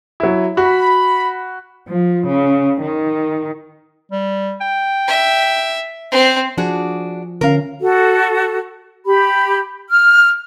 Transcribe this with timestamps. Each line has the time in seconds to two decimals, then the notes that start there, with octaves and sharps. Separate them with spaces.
0.20 F#3 E4
0.57 F#4 B5
1.88 F3
2.27 C#3
2.81 D#3
4.12 G3
4.61 G5
5.08 E5
6.12 C4 C5
6.57 F3 D4 F#4 G#4
7.41 D3 C#4 A#4 F5
7.81 F#4 A4
9.06 G4 B5
9.90 F6